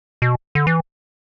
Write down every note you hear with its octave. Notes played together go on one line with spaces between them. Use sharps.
B2
D3
E3